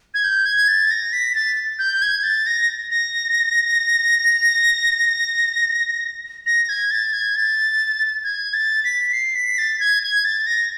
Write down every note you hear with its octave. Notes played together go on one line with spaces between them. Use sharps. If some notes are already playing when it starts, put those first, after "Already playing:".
G#6
G6
G#6
A6
A#6
B6
A6
G6
G#6
A6
A#6
A#6
A#6
G#6
A6
G#6
A6
G#6
A6
B6
C7
B6
A6
G#6
G#6
A6
A#6